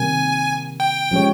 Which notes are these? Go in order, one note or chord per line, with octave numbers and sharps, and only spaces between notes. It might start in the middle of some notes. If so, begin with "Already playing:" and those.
Already playing: C3 D#3 G3 A#3 G#5
G5
F3 G#3 C#4 G4 C#5